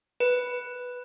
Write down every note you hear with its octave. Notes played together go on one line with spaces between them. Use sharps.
B4